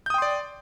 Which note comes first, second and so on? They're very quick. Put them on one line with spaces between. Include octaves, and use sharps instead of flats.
G6 D#6 G5 C6 D5